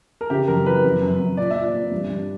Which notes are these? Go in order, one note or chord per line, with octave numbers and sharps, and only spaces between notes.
A#4
C#3 G4
F#2 A#4
E3 B4
F#2
F#2
F#2
A#2 D5
E5
A#2
D5
A#2
G2
G2